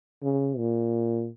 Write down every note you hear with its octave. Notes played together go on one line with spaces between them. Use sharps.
C#3
A#2